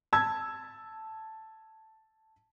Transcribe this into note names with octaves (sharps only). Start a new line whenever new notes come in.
A5 E6 G#6